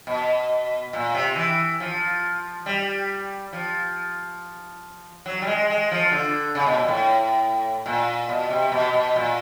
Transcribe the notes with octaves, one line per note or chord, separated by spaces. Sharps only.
B2
A#2
C3
E3
F3
G3
F3
F#3
G3
G#3
G#3
F3
D3
C#3
B2
A#2
A2
A#2
B2
C3
B2
B2
A#2